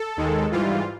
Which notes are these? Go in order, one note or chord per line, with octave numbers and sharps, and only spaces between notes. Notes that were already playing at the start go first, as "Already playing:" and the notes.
Already playing: A4
D#2 D#3 G#3
G#2 E3 G3 F4